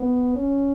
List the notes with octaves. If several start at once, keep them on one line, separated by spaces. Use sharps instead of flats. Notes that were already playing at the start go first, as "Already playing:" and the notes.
Already playing: B3
C#4